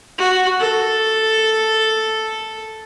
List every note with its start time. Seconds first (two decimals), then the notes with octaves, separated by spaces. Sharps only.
0.18 F#4
0.60 A4